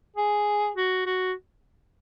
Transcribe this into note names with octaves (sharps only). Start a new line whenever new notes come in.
G#4
F#4
F#4